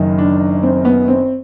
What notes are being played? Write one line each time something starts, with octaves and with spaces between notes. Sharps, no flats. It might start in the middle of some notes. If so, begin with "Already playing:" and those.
Already playing: F#1 F#2 D#3
D4
C4
B3
C4